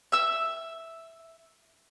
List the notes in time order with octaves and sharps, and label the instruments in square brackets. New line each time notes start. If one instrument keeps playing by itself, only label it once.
[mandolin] E5 E6